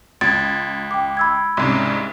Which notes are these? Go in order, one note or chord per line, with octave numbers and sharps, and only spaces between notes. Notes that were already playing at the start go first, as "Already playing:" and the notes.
C#2 G#6 A6
G5 D6
B5 E6 G#6
C2 G#2 C#3